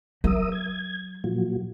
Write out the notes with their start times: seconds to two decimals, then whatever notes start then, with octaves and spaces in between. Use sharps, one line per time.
0.24 F#3 A#4 E5 D#6
0.52 G#6
1.24 A#2 F3 F#3